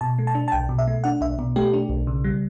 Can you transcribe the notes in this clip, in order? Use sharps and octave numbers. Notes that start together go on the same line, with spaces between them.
B2 A5
A3
A5
D4
A5
B1 G5
B2
E5
A3
D4 F#5
B1 E5
B2
A3 G4
D4
B1
C#3
G3